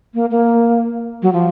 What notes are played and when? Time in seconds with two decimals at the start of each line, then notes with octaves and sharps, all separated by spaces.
0.14 A#3
0.31 A#3
1.22 F#3
1.33 F3